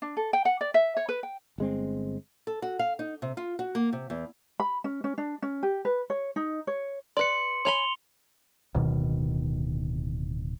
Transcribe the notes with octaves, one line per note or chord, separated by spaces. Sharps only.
D4
A4
G5
F#5
D5
E5
C#5
B4
G5
G1 G#3 C4
A4
F#4
F5
D#4
C3
F4
F#4
A#3
C3
E2
B5
C#4
C#4
D4
C#4
G4
B4
C#5
D#4
C#5
B4 D5 C6 C#7
C#5 G#5 B5 C6 F7 G7
D1 B2 D#3